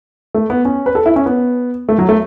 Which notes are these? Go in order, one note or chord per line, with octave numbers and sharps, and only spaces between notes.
A3
B3
C#4
B4
A4
E4
C#4
B3
A3
F#3
A3